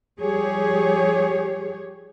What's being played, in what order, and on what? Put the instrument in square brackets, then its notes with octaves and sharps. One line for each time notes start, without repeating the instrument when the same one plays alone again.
[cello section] F3 G3 G4 G#4 C#5